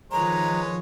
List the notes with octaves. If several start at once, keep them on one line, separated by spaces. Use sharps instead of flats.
D#3 F3 G#3 B4 C#5 A#5